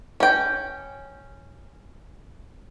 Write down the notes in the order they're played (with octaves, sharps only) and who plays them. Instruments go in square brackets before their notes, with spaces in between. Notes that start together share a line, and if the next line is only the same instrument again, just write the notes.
[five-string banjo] C#4 G5